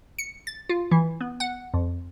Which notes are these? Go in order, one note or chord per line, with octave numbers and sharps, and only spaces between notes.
C#7
A6
F4
E3
B3
F#5
F2